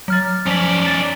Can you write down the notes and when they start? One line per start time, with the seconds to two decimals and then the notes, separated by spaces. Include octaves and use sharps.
0.08 F#3 F6 A6
0.47 F3 C#4 D5 B6
0.86 A6